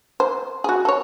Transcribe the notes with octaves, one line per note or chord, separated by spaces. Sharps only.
C5
F#4 G#4
A4 C#5